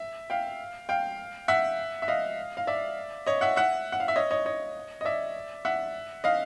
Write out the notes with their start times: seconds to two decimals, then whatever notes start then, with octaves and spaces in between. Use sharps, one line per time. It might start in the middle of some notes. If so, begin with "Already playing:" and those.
Already playing: E5
0.30 F5 G5
0.89 F5 G5
1.48 E5 F#5
2.02 E5
2.08 D#5 F5
2.57 F5
2.67 D5 E5
3.27 C#5 D#5
3.41 E5 F#5
3.56 E5 F#5
3.92 F#5
4.00 F5
4.08 E5
4.16 C#5 D#5
4.31 C#5 D#5
4.46 C#5 D#5
5.01 D#5
5.05 D5 E5
5.65 E5 F#5
6.24 D#5 F5